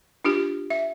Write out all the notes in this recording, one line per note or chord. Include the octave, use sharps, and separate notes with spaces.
D4 F4 G4
E5